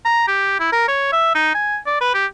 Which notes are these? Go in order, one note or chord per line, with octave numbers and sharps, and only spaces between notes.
A#5
G4
E4
A#4
C#5
E5
D#4
G#5
D5
B4
G4